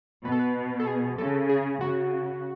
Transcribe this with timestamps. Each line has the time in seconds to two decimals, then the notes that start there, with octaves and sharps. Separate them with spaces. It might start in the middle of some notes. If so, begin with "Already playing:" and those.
0.25 B2 B4
0.32 A4
0.39 B4
0.80 A4
0.87 G#4
1.18 C#3 A4
1.49 G#4
1.81 C#3 F#4